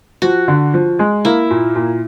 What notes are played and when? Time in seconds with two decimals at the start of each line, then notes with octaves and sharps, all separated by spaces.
0.22 F3 F#4
0.48 D3
0.74 F3
0.99 G#3
1.25 A#3 E4
1.51 A#2
1.76 A#2